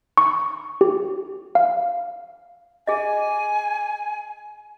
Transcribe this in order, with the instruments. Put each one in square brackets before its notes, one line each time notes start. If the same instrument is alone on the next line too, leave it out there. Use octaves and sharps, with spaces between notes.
[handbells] C#6
G4
F5
[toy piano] G#4 D#5 [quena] G#5